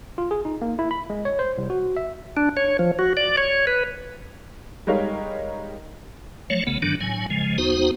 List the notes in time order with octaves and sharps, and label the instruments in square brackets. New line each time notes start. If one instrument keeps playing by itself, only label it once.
[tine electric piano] F4
G#4
D#4
A#3
E4
B5
G#3
C#5
C5
C2
F#4
E5
[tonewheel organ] D4
C#5
F3
F#4
D5
C#5
B4
[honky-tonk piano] G3 G#3 D#4 A#4 C#5 F5
[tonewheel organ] F3 F#3 A3 C#5
F#1 B1 C#3 A3 B3
G2 D3 D#3 F#3 D4
A2 F#3 G#5
C#3 F3 G#3
D#2 B3 D#4 F#4 C5